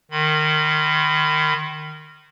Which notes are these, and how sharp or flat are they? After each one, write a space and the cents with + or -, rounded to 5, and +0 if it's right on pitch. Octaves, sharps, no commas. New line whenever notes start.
D#3 -20 B5 +30